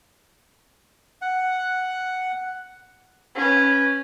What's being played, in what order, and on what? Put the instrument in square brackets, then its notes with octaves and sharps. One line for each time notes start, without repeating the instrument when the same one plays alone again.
[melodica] F#5
[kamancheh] C#4 B4